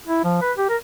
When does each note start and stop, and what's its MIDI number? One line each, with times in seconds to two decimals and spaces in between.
0.07 0.23 64
0.24 0.37 53
0.41 0.52 71
0.57 0.68 67
0.69 0.76 70